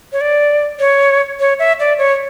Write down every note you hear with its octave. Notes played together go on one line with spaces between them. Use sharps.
C#5
D5
C#5
C#5
E5
D5
C#5